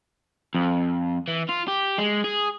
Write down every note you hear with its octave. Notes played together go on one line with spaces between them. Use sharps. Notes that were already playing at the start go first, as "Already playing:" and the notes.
F2
E3
F4
G4
G#3
G#4